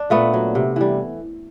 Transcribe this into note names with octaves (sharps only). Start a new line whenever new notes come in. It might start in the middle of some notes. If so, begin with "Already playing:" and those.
Already playing: D4
A#2 A3 B3
F#3
C3
E3 G3